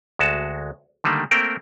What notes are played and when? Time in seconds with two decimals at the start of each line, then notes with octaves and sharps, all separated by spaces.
0.19 D2 G#3 F#4 A5
1.04 D3 D#3 G3 A3 A#3
1.31 A3 A#3 C4 A#4 G5